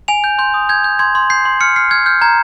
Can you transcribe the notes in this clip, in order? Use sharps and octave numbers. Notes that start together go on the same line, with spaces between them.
G#5 F7
G6
C6 G6
D#6
G6 G#6
G6
C6 G#6
C6
G6 C7
C6
F6 C#7
F6 C7
F6 G#6
F6 G6
A#5 G#6